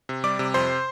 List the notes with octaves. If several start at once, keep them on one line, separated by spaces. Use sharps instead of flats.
C3
G3 D5 D6
C3
F2 C5 C6